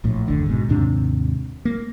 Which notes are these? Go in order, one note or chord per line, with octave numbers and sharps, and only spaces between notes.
A#1 A2
F#1 D#2 D3
G#2 B2
D#2 G#2 C3 D4
A#3